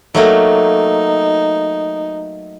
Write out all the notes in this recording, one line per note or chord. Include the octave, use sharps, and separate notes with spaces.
F#3 A3 A#3 D#4